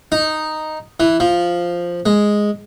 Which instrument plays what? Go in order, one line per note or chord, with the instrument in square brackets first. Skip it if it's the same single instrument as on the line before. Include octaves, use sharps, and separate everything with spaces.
[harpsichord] D#4
E3
F3
G#3